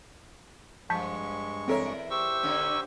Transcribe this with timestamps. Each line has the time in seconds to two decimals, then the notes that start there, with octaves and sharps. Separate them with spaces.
0.90 G2 F3 G#3 A5 C#6 G6 B6
1.68 E2 C4 A4 A#4 C#5 E5
2.10 G4 C5 C#6 E6
2.43 D3 A#3 C#4